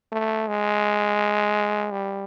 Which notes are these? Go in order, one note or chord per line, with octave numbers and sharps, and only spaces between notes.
A3
G#3
G3